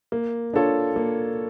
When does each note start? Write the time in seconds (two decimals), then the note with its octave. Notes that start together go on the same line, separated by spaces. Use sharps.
0.12 A#3
0.54 D4 F4 A4 C#5
0.96 A#3